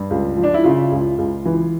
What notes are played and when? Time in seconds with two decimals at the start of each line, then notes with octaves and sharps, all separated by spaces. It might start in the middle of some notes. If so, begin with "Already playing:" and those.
Already playing: G2
0.10 C#2
0.37 F3
0.43 D4
0.54 E4
0.64 C#3 F4
0.92 C#2
1.18 C#2
1.45 E3